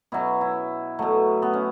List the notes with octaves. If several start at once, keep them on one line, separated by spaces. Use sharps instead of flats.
B2 F#3 E4
E4
B2 F#3 A3
B3
C#4